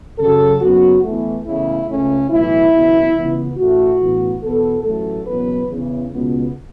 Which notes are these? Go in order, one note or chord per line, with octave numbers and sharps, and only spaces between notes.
F#2 C#3 F#3 A4
F#1 F#2 F#3 B3 F#4
E2 E3 A3
E2 C#3 A3 E4
C#2 C#3 A3 C#4
B1 A2 E3 E4
F#1 E2 B2
C#2 C#3 E3 B3
A1 A2 A3 F#4
A1 A2 E3 B3
E2 B2 B3 A4
A1 A2 F#3 A3 A4
F#1 E2 B2 F#3 B3 B4
E2 C#3 E3
C#2 B2 B3